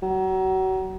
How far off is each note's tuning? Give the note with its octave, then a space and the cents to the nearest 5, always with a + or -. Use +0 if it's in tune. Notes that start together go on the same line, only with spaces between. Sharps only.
F#3 +35